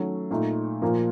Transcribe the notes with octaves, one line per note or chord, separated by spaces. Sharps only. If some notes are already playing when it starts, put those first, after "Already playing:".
Already playing: D#3 F#3 A3 C#4 A4
A#2 A3 D#4
A#2 F3 A#3